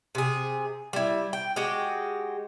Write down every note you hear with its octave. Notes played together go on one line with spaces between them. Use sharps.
C3 G#4
G3 E4
G5
G#3 F#4 G4